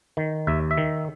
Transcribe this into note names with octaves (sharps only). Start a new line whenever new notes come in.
D#3
D#2 E5
E5
D#3